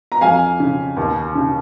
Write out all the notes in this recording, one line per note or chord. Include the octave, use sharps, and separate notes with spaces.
A#5
F2 F5 G#5
C#3
D#2
C#3